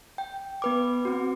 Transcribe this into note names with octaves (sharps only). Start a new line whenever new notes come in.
G5
B3 B4 D6
C4 F#4